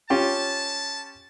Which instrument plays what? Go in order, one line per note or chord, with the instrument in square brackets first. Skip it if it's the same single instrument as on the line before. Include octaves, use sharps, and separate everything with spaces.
[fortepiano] C#4 F4 G4 [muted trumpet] A5